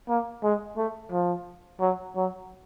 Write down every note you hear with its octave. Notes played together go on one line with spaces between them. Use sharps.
A#3
G#3
A3
F3
F#3
F#3